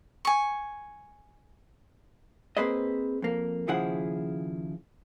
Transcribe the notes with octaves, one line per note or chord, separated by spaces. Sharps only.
G#5 C#6
A#3 C4 G#4 B4 C5 D#5
F2 A#3
D#2 C#3 F3 E4 G#4 F#5